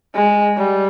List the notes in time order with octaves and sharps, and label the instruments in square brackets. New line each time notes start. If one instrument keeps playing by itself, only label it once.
[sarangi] G#3
G3